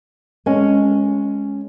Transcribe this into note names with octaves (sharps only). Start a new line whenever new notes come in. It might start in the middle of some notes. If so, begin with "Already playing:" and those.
G#3 C#4